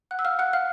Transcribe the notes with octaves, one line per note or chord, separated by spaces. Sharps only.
F#5 F#6
E6
F5 F6
F#5 F#6
F5 F6